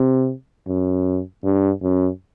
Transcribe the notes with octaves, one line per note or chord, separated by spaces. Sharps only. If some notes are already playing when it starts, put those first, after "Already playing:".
Already playing: C3
F#2
G2
F#2